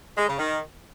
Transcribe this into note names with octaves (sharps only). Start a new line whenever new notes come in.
G#3
C#3
D#3